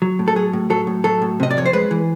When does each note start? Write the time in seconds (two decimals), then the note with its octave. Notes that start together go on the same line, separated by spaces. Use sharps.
0.02 F#3
0.19 A2
0.28 A4
0.35 F#3 G#4
0.53 A2
0.70 F#3 A4
0.87 A2
1.04 F#3 A4
1.22 A2
1.40 C3 D#5
1.51 D5
1.57 F2 C#5
1.66 C5
1.73 G#3 B4
1.91 E3